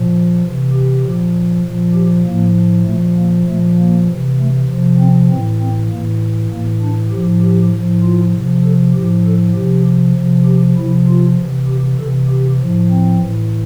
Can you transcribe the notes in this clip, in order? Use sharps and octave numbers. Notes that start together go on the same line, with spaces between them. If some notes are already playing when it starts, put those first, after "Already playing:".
Already playing: A#2 F3
C3 E3
G4
A#2 F3
A#2 F3
G4
A2 F3 A#3
A#2 F3 A3
A#3
A#2 F3 A3
A#3
C3 E3
A3
C3 F3
C4
A2 E3 C4
C4
A2 E3 A#3
A2 E3 A#3
D4
A2 F3 G4
G4
A2 F3
F4
C3 F3
A4
A2 F3 G4
A4
C3 F3 G4
C3 F3
G4
C3 F3 E4
F4
C3 E3
G4
C3 E3 A4
G4
A2 F3
C4
A2 E3